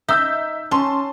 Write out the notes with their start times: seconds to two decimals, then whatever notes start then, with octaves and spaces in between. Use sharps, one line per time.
0.09 D#4 E5 E6 G6
0.71 C#4 A5 C6